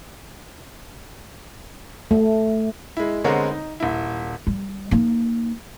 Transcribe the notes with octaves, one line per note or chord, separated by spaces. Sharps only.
A3
G#3 E4
D3 G#3 B3 C4 A#4 C#5
D#4
D#1 E4
G3
A#3 D#4